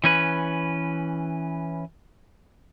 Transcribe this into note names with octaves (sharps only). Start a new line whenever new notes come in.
E3 C#4 B4